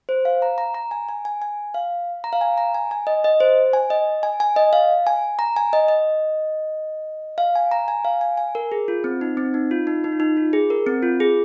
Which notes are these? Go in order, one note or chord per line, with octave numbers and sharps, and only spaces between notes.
C5
F5
A#5
A#5
A#5
G#5
G#5
G#5
G#5
F5
A#5
F5
G#5
A#5
G#5
G#5
D#5
D#5
C5
G#5
D#5
G#5
G#5
D#5
F5
G#5
A#5
G#5
D#5
D#5
F5
G#5
A#5
G#5
F5
G#5
G#5
A#4
G#4
F4
C4
D#4
C4
D#4
F4
D#4
D#4
F4
D#4
F4
G#4
A#4
C4
F4
G#4